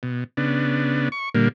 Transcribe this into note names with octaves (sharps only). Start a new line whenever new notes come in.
B2
C#3 B3 D4
C#6
A#2 D3 G3 A#3